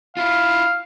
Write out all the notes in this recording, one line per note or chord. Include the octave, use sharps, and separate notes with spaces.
E4 F4 F5